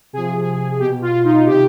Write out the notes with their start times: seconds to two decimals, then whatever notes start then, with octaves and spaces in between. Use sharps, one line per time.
0.13 C3 F3 G#4
0.80 B2 G4
1.02 F4
1.24 D#4
1.46 C3 D#3 G4